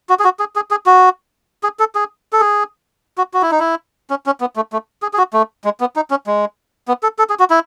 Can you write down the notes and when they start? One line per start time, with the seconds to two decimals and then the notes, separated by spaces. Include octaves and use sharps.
0.09 F#4
0.20 G#4
0.24 F#4
0.39 G#4
0.56 G#4
0.71 G#4
0.86 F#4
1.63 G#4
1.79 A4
1.95 G#4
2.33 A4
2.40 G#4
3.18 F#4
3.34 F#4
3.42 E4
3.51 D#4
3.60 E4
4.10 C#4
4.26 C#4
4.41 B3
4.56 A3
4.73 A3
5.02 G#4
5.13 G#4
5.18 F#4
5.33 A3
5.65 G#3
5.81 B3
5.96 D#4
6.11 C#4
6.27 G#3
6.88 B3
7.03 A4
7.19 A4
7.30 G#4
7.39 F#4
7.50 E4